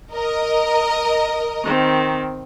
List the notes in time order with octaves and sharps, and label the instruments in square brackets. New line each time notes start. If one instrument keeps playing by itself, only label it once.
[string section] A#4 D#5
[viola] D#3 C4